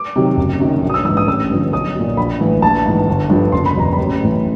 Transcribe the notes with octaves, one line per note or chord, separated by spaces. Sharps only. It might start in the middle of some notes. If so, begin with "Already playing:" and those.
Already playing: D6
C3 D#3 F#3
F#1
F#2 D#3 F#3
A#1
D#6
E6
G#2 E3 E6
D#6
A1 E6
G2 D3 F3
B1 D#6
A#2 F#3
A#1 B5
A2 E3
A#1 A5
G#2 E3
G1
G2 D3 F3
F#1 C6
B5
E2 B2 A#5
A1 B5
A2 E3